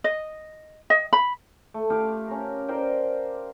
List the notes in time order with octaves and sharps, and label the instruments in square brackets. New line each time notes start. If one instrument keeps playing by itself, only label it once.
[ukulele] D#5
D#5
B5
[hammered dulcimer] A3
F4 G4 F5 D6
C#4 A#4
A#4 C5 D5 G5